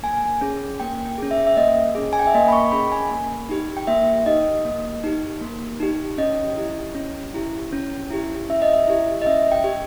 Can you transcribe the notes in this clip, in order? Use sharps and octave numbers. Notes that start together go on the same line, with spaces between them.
A#3 G#5
C#4 G#4
A#3 G5
G5
C#4 G#4
E5
E5
A#3 D#5
C#4 G#4
G#5
G5
E5
A#3 D#5
B5
C#6
C#4 G#4 B5
G#5
A#3
D#4 G4
G5
A#3 E5
D#4 G4 D#5
A#3
D#4 G4
A#3
D#4 G4
C#4 D#5
E4 G4
C#4
E4 G4
C#4
E4 G4
C#4 E5
D#5
E5
E4 G4
D#5
C#4 E5
G5
G4